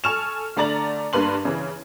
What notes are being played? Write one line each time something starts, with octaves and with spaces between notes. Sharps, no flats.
A4 G#5 C#6 F6 E7 F7
D3 A3 D5 A#5 A6 F#7
G2 A#3 B4 C6 F#7
C#3 E3